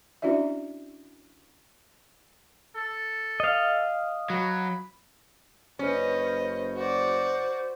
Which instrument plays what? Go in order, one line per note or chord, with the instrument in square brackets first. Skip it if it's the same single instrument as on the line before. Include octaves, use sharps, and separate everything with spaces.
[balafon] C#4 D4 E4 F#4 D5 E5
[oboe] A4
[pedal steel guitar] D#5 F5
[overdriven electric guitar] F#3 [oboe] B5
[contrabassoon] F#1 [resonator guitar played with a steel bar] C#4 [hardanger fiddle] B4 D#5 [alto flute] C5
[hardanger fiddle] F#4 D5 [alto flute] C5